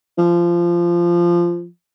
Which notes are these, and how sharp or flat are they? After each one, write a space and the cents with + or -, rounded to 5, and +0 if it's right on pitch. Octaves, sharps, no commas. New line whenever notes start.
F3 -15